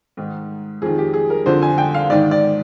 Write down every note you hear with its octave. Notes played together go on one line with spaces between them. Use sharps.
G#2 D#3
F2 D#3 G#4
G4
G#4
A#4
F2 D3 F3 C5
G#5
G5
F5
G#2 D#3 D5
D5